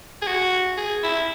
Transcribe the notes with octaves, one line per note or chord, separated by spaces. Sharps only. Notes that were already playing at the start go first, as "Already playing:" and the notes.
G#4
F#4
G#4
E4